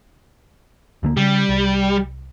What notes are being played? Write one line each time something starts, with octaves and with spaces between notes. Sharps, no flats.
D2 D3 A#3
C#3 G3
C2